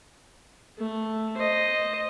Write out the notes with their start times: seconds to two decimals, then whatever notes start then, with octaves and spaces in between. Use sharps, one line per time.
0.79 A3
1.37 C5 D#5